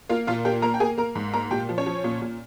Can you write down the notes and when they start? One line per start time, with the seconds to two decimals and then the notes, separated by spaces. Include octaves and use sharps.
0.09 A#3 F4 F5
0.27 A#2 F4 F5
0.45 A#3 G4 G5
0.62 A#3 A#4 A#5
0.74 G5
0.80 A#3 G#4 G#5
0.98 A#3 A#4 A#5
1.15 G#2
1.34 A#3 A#4 A#5
1.51 A#2 G4 G5
1.69 F3
1.78 C#4 C#5
1.86 F3
2.04 A#2
2.22 A#2